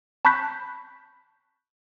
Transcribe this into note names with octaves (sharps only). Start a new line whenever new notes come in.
A5 B5 C#6 F#6 G6 B6